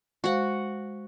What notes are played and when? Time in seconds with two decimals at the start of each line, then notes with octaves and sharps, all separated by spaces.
0.24 G#3 F#4 C5 F5 F#5